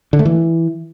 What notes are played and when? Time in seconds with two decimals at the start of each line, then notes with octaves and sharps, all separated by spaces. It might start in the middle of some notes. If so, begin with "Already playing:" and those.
0.13 D3
0.19 A3
0.25 E3